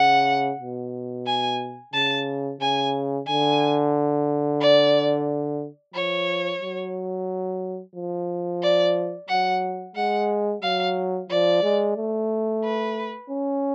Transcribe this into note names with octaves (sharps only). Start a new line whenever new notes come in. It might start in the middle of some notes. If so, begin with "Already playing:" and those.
Already playing: C#3 F#5
B2
G#5
C#3 A5
C#3 G#5
D3 G#5
D5
F3 C#5
F#3
F3
D5
F#3 F#5
G#3 F#5
F#3 F5
F3 D5
G#3
A3
B4
C#4